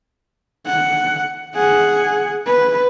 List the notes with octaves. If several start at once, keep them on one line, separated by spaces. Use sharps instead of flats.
F#5
G#4 F#5
B4